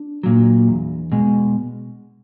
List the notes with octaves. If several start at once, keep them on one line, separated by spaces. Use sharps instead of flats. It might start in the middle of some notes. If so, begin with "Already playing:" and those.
Already playing: D4
A#2 F#3
E2
B2 G#3